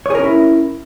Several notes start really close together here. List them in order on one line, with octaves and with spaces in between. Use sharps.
C#5 G#4 A#4 C#4 E4